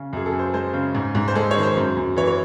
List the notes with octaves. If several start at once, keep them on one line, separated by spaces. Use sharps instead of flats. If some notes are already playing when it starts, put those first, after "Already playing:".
Already playing: C#3
F#2 G#4
A4
F#2
C5
G#3 C5
C#3
G#2
G#2
C5
G#3 A4
C#5
D#3
C5
F#2
F#2
E3 C#5
C#5